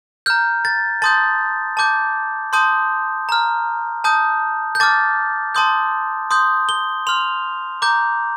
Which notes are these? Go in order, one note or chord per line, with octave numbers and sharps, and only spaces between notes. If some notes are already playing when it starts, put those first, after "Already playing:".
A#5 F6 G6
A6
A5 C6 D#6 G6 A6
A5 D6 G6
A5 C6 D#6 G6
A#5 F6
A5 D#6 G6
G6
A5 D6 F6 A6
A5 C6 D#6 G6
C6 D#6 G6
G7
C6 F6 F7
A#5 D6 G6